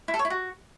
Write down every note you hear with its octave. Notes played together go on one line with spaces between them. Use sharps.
E4
A4
C#5
E4
F#4